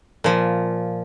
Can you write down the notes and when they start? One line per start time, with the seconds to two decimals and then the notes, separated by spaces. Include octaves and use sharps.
0.24 A#2 F3